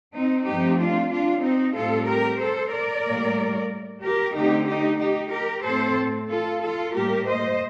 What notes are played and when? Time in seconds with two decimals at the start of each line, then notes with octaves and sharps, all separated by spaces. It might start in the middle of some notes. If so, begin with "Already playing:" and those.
0.15 C4 D#4
0.47 G2 F3 A3 C4 D#4 G4
0.80 D4 F4
1.12 D4 F4
1.44 C4 D#4
1.77 A2 G3 C4 F4 A4
2.09 G4 A#4
2.41 A4 C5
2.73 A#4 D5
3.06 A2 G3 A#3
4.03 G4 A#4
4.35 D3 A3 C4 D#4 G4
4.67 D#4 G4
5.00 D#4 G4
5.32 G4 A#4
5.64 A2 A3 C4 A4 C5
6.29 F4 A4
6.61 F4 A4
6.94 A2 G3 A#3 G4 A#4
7.26 C5 D#5